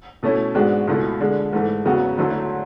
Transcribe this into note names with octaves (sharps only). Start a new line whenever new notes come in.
B2 A3 C#4 E4
G#2 G#3 B3 D4 F#4
C#2 B2 A3 E4
D3 G#3 D4
G#2 E3 A3
E2 C#3 F#3 B3 F#4
D2 D3 F#3 A3 E4